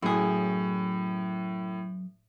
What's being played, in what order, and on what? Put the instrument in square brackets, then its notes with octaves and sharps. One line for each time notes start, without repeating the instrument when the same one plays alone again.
[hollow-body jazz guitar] F#2 G#4 [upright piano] A2